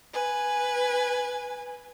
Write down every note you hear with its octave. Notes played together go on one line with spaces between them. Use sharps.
B4 G#5